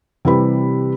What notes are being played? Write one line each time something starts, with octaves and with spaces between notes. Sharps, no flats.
C3 E3 G3 B4 B5